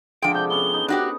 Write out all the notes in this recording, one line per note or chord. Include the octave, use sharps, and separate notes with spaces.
D3 F3 G#3 G5 D7
C3 D5 G6
B3 C#4 A4 G7
D#4
D4 F#4 G4 F#6